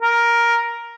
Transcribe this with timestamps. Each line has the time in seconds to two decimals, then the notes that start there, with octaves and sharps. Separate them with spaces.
0.02 A#4